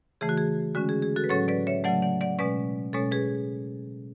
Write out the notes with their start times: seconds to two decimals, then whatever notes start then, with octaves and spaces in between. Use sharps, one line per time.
0.21 C#3 E3 A3 G#4
0.29 F#4
0.37 G#4
0.75 D3 G#3 C#4 F#4
0.89 G#4
1.02 G#4
1.16 F#4 A4
1.24 B4
1.29 A2 F#3 C#4 A4 C#5
1.48 B4 D5
1.67 C#5 E5
1.84 C#3 F#3 A3 D5 F#5
2.02 D5 F#5
2.21 D5 F#5
2.39 B2 G#3 C#4 B4 D5
2.93 B2 G#3 C#4 A4 C#5
3.11 G#4 B4